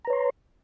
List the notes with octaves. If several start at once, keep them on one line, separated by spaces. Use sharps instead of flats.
B4 C#5 A#5 C6